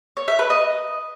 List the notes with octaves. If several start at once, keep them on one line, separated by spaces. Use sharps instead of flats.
C#5
E5
B4
D#5